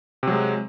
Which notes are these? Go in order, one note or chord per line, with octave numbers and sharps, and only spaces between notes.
C3 F#3 G#3